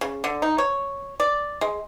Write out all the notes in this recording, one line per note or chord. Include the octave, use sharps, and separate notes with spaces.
C#3
D3
D#4
C#5
D5
G#3